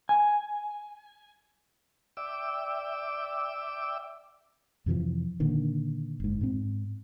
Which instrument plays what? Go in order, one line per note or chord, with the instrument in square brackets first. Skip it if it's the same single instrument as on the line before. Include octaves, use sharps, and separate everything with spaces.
[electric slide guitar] G#5
[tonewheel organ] D5 E5 G5 D6 E6
[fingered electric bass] F2 C3 E3 F3
A#2 D3 D#3
F#1 G#2
G#2 C4